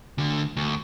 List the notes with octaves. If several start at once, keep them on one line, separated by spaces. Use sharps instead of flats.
D2 D3
D2